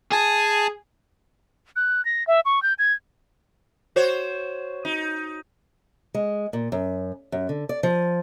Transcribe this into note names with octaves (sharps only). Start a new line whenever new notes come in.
G#4 G#5 A5
F#6
A#6
E5
C#6
G6
G#6
F#4 C5 C#5
D#4
G#3
A#2
F#2
F#2
D3
D5
F3